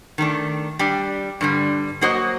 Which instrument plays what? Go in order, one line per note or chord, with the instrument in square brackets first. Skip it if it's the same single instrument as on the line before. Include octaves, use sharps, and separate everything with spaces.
[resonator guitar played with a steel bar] D#3 A3 D4
G3 D4 G4 D5
G2 D3 G3
F#3 A#3 F#4 C5 D#5